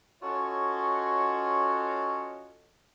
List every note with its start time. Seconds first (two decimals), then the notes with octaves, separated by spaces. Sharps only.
0.23 C#4 F4 F#4 A4 C#5 D#5